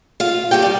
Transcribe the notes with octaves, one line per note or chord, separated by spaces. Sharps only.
F4 F5
D#2 D#3 G3 G4 G5
D5